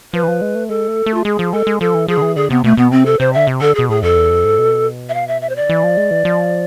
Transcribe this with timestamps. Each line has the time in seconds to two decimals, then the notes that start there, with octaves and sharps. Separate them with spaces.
0.13 F3 B4
0.23 E3
0.28 F3
0.41 G#3
0.55 A3
0.69 G#3 A4
0.88 A3
1.06 A3
1.14 F4
1.25 G#3 G#4
1.39 F3
1.52 G#3 A4
1.67 G#3
1.80 F3 A4
1.94 E3
2.08 F3 G#4
2.17 D3
2.22 E3
2.36 D3 G#4
2.50 C3 B3
2.64 B2 A3
2.77 B2 B3
2.91 C3 C4
3.06 A4
3.20 C3 C5
3.33 D3 E5
3.47 C3
3.61 D3 A4
3.75 B2 G#4
3.89 A2 G#4
4.03 F2 A4
4.17 E2
4.30 F2
4.45 G#2
4.59 B2
5.09 E5
5.14 F5
5.28 E5
5.42 E5
5.49 C5
5.56 D3 D5
5.69 E3
5.83 F3
5.97 G#3
6.11 E3
6.25 F3